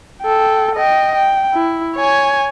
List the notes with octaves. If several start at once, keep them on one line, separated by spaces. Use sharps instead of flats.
A4 G5
D#5 G5
G5
E4
C#5 G#5